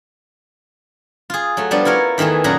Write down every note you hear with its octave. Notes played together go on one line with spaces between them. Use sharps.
F4 G#4
F#3 A3
F3 G3 B3 D4
E4 F4 A#4 C#5
E2 D#3 E3 A3 G#4
F#2 A#2 F#3 G#4 B4 A#5